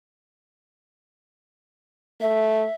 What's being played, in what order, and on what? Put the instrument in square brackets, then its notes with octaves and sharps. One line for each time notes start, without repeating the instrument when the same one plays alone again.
[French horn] A3 [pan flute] E5